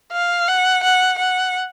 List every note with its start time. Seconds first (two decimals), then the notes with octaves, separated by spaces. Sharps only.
0.12 F5
0.48 F#5
0.83 F#5
1.18 F#5